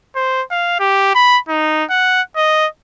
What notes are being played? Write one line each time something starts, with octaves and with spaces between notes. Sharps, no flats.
C5
F5
G4
B5
D#4
F#5
D#5